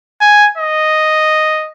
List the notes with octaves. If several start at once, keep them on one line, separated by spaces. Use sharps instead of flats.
G#5
D#5